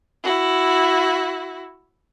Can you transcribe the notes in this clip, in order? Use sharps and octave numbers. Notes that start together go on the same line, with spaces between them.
E4 F#4